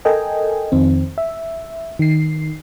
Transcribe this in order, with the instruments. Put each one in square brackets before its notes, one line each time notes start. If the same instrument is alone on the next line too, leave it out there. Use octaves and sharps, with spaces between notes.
[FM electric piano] A4 A#4 D#5 G5 G#5
F2 D#3 C4
E5
D#3 C7